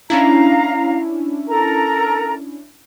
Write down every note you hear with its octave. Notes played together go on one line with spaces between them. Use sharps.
C#4 D4 E4 F5 A#5
A4 A#4 A#5